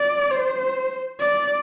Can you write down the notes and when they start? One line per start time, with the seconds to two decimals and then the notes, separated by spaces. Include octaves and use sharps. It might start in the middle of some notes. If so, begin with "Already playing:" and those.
Already playing: D5
0.31 C5
1.20 D5